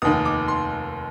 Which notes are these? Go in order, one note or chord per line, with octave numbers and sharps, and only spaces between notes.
F1 D#2 D#3 D#6
D6
C6